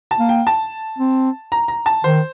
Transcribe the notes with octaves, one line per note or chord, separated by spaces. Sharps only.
A5
A#3
G5
A5
C4
A#5
A#5
A5
D#3 C5